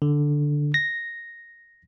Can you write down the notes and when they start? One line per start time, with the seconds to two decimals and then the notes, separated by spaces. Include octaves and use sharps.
0.02 D3
0.74 A#6